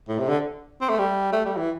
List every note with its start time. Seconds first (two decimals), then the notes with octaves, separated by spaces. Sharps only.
0.09 A2
0.19 C3
0.29 D3
0.81 C4
0.90 A3
0.99 G3
1.32 A3
1.45 G3
1.57 E3